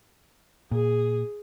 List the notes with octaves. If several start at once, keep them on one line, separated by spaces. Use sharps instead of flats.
A#2 G#4